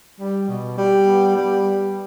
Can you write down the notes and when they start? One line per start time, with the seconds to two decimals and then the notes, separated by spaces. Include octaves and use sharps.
0.19 G3
0.47 B2
0.77 G3
1.05 B3
1.35 G3